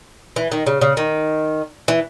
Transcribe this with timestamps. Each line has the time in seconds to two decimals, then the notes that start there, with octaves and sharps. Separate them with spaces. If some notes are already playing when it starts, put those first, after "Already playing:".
0.36 E3
0.52 D#3
0.67 C#3
0.81 C#3
0.97 D#3
1.88 E3